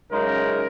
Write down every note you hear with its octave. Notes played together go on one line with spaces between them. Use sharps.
F#2 C#3 G#3 D#4 A#4